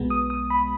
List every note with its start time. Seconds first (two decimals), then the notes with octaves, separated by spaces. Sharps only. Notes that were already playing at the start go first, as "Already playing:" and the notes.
Already playing: B1 B2 G#3 B3
0.10 D#6
0.30 D#6
0.50 B5